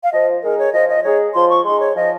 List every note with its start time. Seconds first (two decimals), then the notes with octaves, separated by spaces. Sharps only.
0.04 F5
0.13 F3 D#5
0.42 G#3 D#4 G#4 A#4
0.59 C#5
0.73 F3 D#5
0.89 D#5
1.04 G#3 D#4 G#4 C#5
1.34 F3 C6
1.50 C#6
1.65 G#3 D#4 G#4 C6
1.80 C#5
1.96 F3 D#5